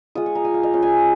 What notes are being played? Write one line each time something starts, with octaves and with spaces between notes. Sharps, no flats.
G#3 F4 D#6
C#6
A#5
G#5
F5
D#5
G#3 C#4 F4 F5
G#5
G#5